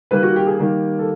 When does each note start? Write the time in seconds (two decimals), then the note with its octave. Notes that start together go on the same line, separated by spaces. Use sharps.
0.11 D#3 G3 A#3 B4
0.23 F#4
0.36 G4
0.47 G#4
0.60 D#3 G3 A#3 G4
0.99 A4